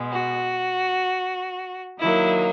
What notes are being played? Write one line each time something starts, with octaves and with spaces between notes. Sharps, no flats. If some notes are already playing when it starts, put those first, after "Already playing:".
Already playing: B2 G#3
F#4
D#3 F#3 A#3 E4